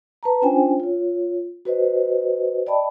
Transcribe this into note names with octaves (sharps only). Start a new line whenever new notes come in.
B4 A5 A#5
C#4 D4 F4 C5 G5 G#5
F4 C#5
F#4 B4 C5 D#5
D5 D#5 G5 A5 B5